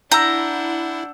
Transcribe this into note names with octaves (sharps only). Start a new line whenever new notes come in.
D4 E4 F#5 A#5 E6 G6